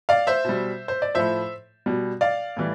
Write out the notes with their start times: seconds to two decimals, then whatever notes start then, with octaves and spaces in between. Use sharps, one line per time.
0.09 D5 F5
0.27 C5 E5
0.45 B2 G3
0.88 C5
1.02 D5
1.15 A2 F3 C5 E5
1.86 B2 G3
2.21 D5 F5
2.57 A2 E3 G3